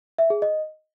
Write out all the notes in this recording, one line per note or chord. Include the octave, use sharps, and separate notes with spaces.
E5
G#4
D#5